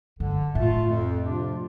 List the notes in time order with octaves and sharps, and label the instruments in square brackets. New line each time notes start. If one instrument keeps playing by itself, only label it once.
[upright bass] G2 [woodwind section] D3
[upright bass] A2 [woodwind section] A3 F4
[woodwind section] F2
C3 F3 D4 F4